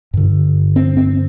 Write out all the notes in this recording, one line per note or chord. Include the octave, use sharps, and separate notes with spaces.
G2 D3
C4
C4